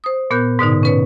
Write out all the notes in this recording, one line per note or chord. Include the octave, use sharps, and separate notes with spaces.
C5 D#6
A#2 B3 A#4 F#6 G6
G#2 B2 D3 D#4
C#4 B4 C#5